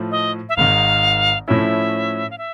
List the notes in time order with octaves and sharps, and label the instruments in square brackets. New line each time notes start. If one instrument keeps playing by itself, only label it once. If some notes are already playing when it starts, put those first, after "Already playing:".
Already playing: [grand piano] A2 F3 A3
[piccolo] D#5
E5
[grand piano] G#1 G#2 D#3 [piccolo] F5
[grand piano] A2 F3 A3 C#4 E4 [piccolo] E5
[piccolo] F5
E5